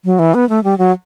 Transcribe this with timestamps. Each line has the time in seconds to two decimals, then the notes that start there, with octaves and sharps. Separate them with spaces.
0.05 F#3
0.19 E3
0.34 B3
0.49 A3
0.64 G3
0.78 F#3